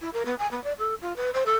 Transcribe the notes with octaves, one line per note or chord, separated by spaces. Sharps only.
E4
A#4
B3
G#5
B3
D5
A4
F4
B4
C5
A4